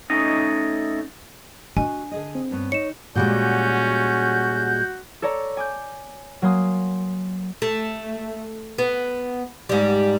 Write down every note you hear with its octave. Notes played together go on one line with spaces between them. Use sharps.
A3 C#4 D#4 D#5
D4 F#4 D#5 G#5
D3 G#4 D#5
C4
G2 B3 C#4
D#4 C#5 C#7 E7
A#2 G3 G#3 C#4 F#4 G6
A4 C#5 D5 A#5
G#5 D6 G6
F#3 A#3 G#5 C6 D#6
A3
B3
G#2 G3